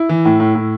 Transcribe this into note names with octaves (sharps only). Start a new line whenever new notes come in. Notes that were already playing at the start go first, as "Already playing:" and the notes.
Already playing: E4
E3
A2
A2
A2